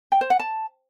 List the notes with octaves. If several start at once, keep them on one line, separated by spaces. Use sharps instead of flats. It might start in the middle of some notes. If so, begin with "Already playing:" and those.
G5
C5
F#5
A5